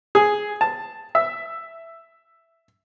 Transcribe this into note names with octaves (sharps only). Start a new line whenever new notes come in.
G#4
A5
E5